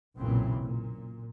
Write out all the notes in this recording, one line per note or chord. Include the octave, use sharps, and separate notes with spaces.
F#1 B1 A#2 C#3 E3 C4
A#2